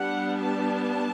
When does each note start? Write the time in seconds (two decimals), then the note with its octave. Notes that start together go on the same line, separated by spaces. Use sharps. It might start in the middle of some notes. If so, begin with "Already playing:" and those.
Already playing: G3 B3 D4 F#5
0.40 A5